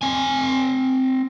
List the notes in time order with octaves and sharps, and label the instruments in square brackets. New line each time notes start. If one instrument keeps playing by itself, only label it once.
[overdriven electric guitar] C4 G#5